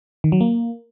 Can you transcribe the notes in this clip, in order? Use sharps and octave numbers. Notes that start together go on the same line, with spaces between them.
D#3
F#3
A#3